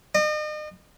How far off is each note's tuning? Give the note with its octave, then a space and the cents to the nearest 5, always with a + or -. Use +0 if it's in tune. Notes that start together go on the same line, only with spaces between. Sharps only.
D#5 -40